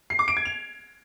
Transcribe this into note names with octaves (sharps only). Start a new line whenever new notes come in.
C7
D6
D7
G#6
F7